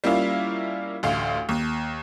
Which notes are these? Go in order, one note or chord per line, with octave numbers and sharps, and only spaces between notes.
G3 A#3 C#4 E4 F4
A1 D2 F5
D#2